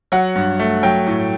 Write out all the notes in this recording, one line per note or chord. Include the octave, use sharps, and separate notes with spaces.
F#3 F#5
G2
A3
F#3 G5
A2